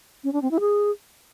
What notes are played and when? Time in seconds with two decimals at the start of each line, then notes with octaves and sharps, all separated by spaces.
0.24 C#4
0.33 D4
0.42 C4
0.51 E4
0.60 G#4